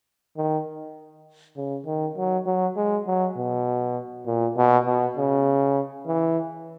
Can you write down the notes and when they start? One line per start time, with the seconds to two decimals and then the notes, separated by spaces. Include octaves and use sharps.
0.37 D#3
1.57 C#3
1.86 D#3
2.17 F#3
2.47 F#3
2.77 G#3
3.07 F#3
3.37 B2
4.26 A#2
4.57 B2
4.86 B2
5.17 C#3
6.07 E3